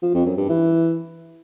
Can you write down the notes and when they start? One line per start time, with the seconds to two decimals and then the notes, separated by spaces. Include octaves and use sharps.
0.02 F3
0.14 F2
0.26 F#2
0.37 G2
0.49 E3